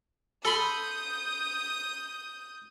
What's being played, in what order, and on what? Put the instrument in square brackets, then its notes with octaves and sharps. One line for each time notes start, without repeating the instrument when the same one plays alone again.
[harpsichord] A4 B5 C6 [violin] D#6 G6